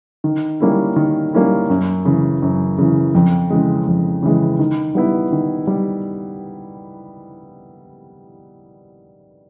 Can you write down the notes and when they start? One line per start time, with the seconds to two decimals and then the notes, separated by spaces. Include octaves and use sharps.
0.24 D#3
0.60 G3 A#3 C#4 E4
0.96 D#3
1.33 G3 A#3 C#4 E4
1.70 F#2
2.05 C#3 E3
2.42 F#2
2.78 C#3 E3
3.15 F2
3.50 C#3 E3 G#3
3.87 F2
4.23 C#3 E3 G#3
4.59 D#3
4.95 G3 B3 E4
5.32 D#3
5.67 G3